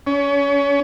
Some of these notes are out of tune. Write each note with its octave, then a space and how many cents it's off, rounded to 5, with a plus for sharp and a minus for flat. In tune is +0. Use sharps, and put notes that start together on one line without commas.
C#4 +30